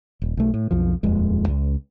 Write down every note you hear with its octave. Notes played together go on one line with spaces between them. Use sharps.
D#1
B1 A3
A2
B1 F2 F3
D#1 F2 G#3
C#2